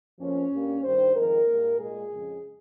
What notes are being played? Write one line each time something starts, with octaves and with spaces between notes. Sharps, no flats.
F2 C#3 F3 A#3 C#4
G2 G3 A#3
G2 D#3 G3 C5
F2 D#3 G#3 A#4
G#2 G3 A#3
A#2 G#3 G#4
F2 C#3 G#3